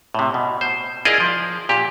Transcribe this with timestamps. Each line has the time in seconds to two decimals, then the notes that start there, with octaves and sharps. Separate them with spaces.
0.15 A2 C3
0.34 B2
0.61 C5
1.05 E4 F4 G#4 A#4 D5 D#5
1.20 F3
1.69 A#2 G4